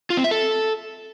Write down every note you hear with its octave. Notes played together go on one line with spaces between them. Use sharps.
F4
C4
E5
A4